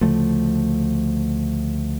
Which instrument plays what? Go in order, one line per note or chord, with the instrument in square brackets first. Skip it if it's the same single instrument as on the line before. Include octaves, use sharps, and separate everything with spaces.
[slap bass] D2 C#3 F3 A3